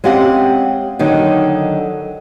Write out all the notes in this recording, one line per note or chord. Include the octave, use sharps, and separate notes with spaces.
G#3 C4 C#4 G4 F5 F#5
D3 D#3 F#3 D#4